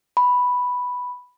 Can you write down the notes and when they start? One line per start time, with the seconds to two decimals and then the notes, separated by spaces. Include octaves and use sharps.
0.17 B5